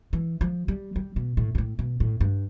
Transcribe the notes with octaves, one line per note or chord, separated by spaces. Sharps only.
E3
F3
G3
G3
B2
A2
G2
A2
B2
A2
G2